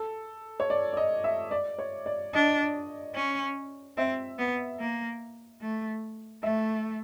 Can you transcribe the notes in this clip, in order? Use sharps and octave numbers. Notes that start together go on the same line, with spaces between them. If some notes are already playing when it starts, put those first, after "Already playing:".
Already playing: A4
C#5
D5
D5
D#5
E5
D5
C#5
D5
D4 D#5
C#4
C4 E5
B3
A#3
A3
A3 E5